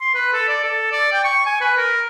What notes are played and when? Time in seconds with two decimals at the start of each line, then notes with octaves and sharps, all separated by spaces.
0.01 C6
0.14 B4
0.33 A4
0.48 D5
0.64 A4
0.91 D5
1.13 G5
1.24 C#6
1.46 G#5
1.61 B4
1.77 A#4